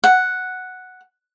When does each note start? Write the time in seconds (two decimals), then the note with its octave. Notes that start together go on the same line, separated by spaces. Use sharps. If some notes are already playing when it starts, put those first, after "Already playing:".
0.04 F#5